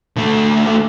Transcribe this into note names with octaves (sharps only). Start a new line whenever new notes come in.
D3 A3